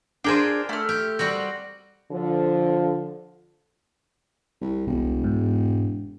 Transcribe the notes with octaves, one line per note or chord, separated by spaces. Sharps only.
D4 F4 G#4 A#4 C5 G5
A3 F6
G4
G3 C4 F#4
D3 F3
C2
E1 C2
G#2